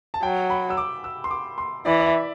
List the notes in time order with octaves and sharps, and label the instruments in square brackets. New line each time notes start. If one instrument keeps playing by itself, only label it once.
[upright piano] A5
[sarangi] F#3 [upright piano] G5
[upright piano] B5
E6
D6
E6
C6
D6
C6
[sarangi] E3 [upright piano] D5
[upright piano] D5
E5